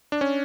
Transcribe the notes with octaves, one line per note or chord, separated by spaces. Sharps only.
D4
C#4